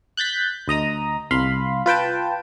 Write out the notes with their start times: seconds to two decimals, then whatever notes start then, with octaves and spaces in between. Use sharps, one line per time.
0.17 F#6 G6 A6 B6
0.68 D2 D#5 A#5 D#6
1.31 C2 F5 B5 C6
1.86 F4 B4 G5 A5